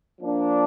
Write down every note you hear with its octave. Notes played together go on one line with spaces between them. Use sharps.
F3 A#3 D4